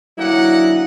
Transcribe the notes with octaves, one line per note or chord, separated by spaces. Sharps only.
D3 E3 F#3 A#3 D#4 E4 F#5